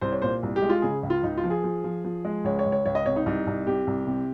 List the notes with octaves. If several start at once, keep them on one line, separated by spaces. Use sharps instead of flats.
C2 C5
C#5
A#2 C5
C2
G4
G#3
F4
C#3 G#4
C#2
F4
C#2 D#4
F4
F3
G#4
F3
F3
F3
G#3
C#2 C#5
C#5
C#2
C#5
C#2 C#5
D#5
C3 C#5
D#4
C2 D#4
C2
C3 G4
C2
C3